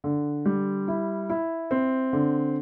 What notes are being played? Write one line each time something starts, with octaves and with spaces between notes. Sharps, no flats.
D3
G3
E4
E4
C4
D3